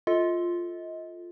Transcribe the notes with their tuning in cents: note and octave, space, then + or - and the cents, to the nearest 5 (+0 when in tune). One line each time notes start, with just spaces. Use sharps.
F4 +0 A4 +0 D#5 +30